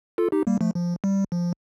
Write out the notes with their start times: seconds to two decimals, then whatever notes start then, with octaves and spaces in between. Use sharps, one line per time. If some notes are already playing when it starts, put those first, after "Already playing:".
0.18 F4 A4
0.32 D#4 G4
0.47 G3 A#3
0.61 F3 A3
0.75 F3
1.04 G3
1.32 F3